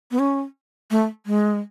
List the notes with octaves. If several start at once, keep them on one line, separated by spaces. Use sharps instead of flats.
B3
C#4
A3
G#3